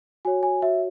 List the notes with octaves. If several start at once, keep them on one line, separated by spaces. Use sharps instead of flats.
F#4 C#5 G#5
G#5
F#4 C#5 E5